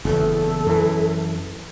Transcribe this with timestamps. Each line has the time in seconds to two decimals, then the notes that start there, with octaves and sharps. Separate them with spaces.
0.05 F#1 E2 A4
0.67 F#2 E3